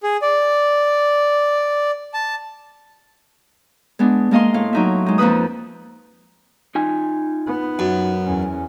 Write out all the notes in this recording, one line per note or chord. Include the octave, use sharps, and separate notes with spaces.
G#4
D5
A5
G#3 B3 D4
G#3 A#3 D#5 F5 C6
A2 F5
F#3 D#4 E5
G#3 D#4
F2 F3 A#3 B4 D#6
D#4 F4 G#5
B3
F#2
E2 C#4